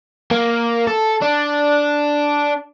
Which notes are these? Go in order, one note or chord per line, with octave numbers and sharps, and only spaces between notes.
A#3
A4
D4